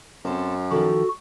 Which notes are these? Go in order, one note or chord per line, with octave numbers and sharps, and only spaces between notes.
F#2 C4 A4 C5
D#3 F3 F#4 A4